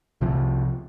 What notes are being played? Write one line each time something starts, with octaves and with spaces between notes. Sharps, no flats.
C2 C3 F3